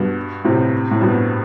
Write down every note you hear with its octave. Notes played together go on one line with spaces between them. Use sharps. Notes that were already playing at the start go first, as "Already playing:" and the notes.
Already playing: G2 B2
A2 C3
A2
G2 B2